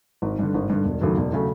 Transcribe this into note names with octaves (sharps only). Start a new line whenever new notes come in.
G#1
G2 D3
G#1
G2 D3
E1
D#2 C#3 F#3 A3
E1
C#3 F#3 A3